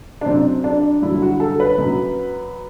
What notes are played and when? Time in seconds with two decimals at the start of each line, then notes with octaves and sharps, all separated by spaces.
0.21 D4
0.26 F#2 F#3 C4
0.64 D4
1.02 G2 D3 F#3 E4
1.22 F#4
1.40 A4
1.60 B4
1.78 F#2 F#3